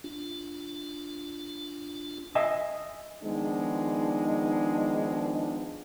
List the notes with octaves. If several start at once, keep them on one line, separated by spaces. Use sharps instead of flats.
D4 F4
D#5 E5 G#5
D#3 F3 G#3 B3 D4 D#4